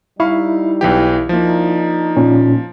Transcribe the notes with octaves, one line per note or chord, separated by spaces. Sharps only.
G3 D#4 E4 F5 C#6
B1 E3 G4
F3 A#3 D4 D#4
A#2 C#4